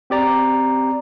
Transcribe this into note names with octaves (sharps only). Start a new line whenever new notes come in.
C4 G4 D5 A#5